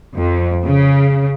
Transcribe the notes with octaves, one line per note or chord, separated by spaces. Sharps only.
F2
C#3